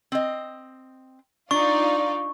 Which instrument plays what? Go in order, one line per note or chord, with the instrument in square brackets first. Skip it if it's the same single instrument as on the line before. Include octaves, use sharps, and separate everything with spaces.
[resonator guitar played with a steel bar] C4 D#5
[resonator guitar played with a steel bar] D4 [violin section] D#4 F4 D5 [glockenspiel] C#6